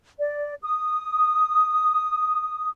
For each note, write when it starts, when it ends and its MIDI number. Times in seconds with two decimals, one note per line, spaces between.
0.20 0.55 74
0.63 2.68 87